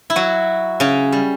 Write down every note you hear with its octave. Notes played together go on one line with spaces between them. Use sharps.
E4
F#3 F#4
C#3 C#4
G3